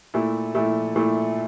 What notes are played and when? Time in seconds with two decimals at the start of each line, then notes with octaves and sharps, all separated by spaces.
0.14 A#2 A3 E4
0.55 A#2 A3 E4
0.96 A#2 A3 E4